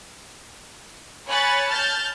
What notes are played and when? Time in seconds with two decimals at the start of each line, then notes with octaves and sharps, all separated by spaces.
1.28 C#5 G#5 B5 C#6 F#6 A6
1.68 A5 F6 G6 A6